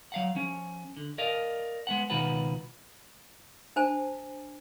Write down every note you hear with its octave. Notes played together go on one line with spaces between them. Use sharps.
F#3 F5 F#5
F3 C#4
D3
A#4 D5 D#5 F5
G#3 B3 F#5
C#2 B2 D#3 F4 B4 F#5
D4 C5 G#5 A5